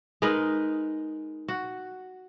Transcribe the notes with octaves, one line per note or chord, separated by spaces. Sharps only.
G#3 D#4 A#4 B4
F#4